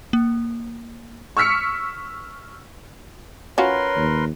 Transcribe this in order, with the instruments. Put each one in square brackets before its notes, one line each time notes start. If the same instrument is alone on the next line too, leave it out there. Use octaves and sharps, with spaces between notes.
[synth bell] A#3
[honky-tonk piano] C#6 E6 F6 B6 C#7
[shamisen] C#4 F4 F#4 [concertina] A#4 B4 C6 [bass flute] C#5
[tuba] D#2